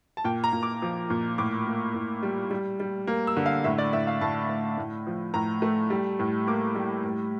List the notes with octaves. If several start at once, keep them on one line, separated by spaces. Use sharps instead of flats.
A5
A#2 G5
A#5
A#2
D6
F3
A#2
A2 D6
A#3
A2
G3
G3
G3
A#3
E6
D3
F5
A2 E5
D5
A2 E5
F5
A2 A5
A2
A2
F3
A2 A#5
A3
G3
A2
A#3 D6
G3
A2